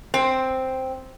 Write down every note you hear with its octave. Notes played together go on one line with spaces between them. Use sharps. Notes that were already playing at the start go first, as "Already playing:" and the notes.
C4